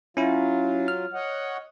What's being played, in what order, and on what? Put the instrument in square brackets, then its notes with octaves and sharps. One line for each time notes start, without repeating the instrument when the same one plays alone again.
[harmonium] F#3 F4 [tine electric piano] C#4 E4
[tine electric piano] F6
[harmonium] C#5 D#5 F#5